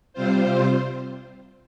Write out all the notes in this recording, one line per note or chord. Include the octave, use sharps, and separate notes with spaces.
C3 G3 C4 F4 C5